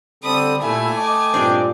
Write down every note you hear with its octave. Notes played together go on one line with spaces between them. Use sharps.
D3 G3 C4 A4 D5 B5 D#6
A#2 A3 E4 G4 E5 G#5
D#5 G5 A5 D6
G2 A#2 C4 D4 G4